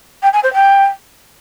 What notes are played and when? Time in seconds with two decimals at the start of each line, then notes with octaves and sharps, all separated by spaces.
0.22 G5
0.33 G#5
0.43 C5
0.54 G5